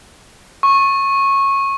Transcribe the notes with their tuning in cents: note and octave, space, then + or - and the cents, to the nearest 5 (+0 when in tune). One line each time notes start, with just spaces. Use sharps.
C#6 -15